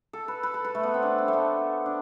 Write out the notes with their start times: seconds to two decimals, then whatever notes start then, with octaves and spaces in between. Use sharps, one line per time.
0.13 A4
0.28 B4
0.43 B4
0.54 A4
0.64 B4
0.75 A3
0.83 B3
0.94 C4
1.03 D4
1.18 C4
1.28 A3
1.33 B3
1.86 D4